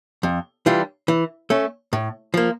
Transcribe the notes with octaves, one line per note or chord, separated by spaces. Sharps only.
F2
E3 G3 D4 F4
E3
A3 C#4
A2
F3 A#3